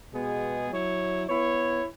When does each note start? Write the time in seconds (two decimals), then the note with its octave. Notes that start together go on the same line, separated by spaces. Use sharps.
0.12 B2 G#3 B3 G#4
0.69 F#3 E4 C#5
1.28 B3 E4 C#5